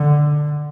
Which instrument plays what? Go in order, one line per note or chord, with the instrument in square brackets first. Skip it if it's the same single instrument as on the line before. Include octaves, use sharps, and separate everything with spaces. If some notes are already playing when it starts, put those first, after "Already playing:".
Already playing: [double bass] D3